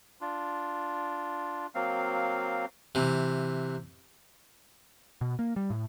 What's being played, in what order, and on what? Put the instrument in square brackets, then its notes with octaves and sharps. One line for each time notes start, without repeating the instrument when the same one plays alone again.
[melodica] D4 F4
F#3 A#3 C4 F5
[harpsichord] C3 E3
[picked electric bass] B2
A#3
G3
A2